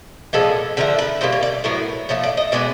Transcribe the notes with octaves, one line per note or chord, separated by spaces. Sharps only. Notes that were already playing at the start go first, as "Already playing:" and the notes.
A#2 F3 G#3 B3 A4
D3 F3 A3 A#4
B4
B2 G3 A#3 C5
C#5
D5
A2 F#3 B3 A#4
A#2 F3 A3 C#5
D5
D#5
B2 G#3 B3 D5